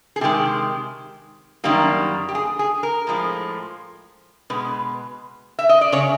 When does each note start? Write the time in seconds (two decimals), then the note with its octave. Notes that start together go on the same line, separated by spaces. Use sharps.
0.16 G#4
0.21 C3 D#3 G#3 G4
1.64 F#2 D#3 G3 A#3
2.28 G4
2.35 G#4
2.59 G#4
2.83 A#4
3.07 A2 F3 G#3
4.50 B2 G#3 B4
5.59 E5
5.69 D#5
5.81 D5
5.92 C#3 C#5